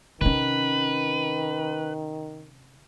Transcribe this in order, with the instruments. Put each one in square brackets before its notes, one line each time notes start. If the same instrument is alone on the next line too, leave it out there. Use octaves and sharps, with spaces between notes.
[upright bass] C3 C#4 [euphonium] D#3 [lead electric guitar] B4